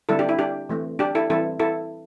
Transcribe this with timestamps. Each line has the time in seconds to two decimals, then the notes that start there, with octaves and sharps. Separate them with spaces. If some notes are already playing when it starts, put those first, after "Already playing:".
0.09 D3 G3 C4 E4 A4
0.19 D4 G4
0.29 E4
0.39 D4 G4
0.69 E3 A3 C4
0.99 D4 G4
1.15 E4 A4
1.30 E3 G3 C4 E4 A4
1.59 E4 A4